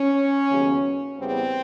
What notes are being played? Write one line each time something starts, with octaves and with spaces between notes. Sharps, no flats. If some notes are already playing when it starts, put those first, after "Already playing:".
Already playing: C#4
D#2 C#3 F#3 B3
E2 C#3 E3 G3 B3 C4